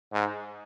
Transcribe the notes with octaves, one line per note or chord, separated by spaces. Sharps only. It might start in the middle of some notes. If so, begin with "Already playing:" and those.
G#2